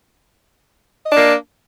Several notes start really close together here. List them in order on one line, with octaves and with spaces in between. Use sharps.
D#5 D4 A#3